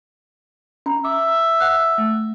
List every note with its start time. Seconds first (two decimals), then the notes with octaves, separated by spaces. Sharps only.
0.86 C#4 A#5 B5
1.05 E5 D6
1.60 F#5 F#6
1.98 A3